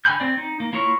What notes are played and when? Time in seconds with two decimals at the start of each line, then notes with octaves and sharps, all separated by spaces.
0.05 D3 G5 G#5 B5 G6
0.20 C4 D5
0.37 D#4
0.60 A#3
0.73 A#3 E4 F4 C#5